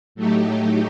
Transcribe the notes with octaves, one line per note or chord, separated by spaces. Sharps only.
A2 F#3 A3 D#4 G4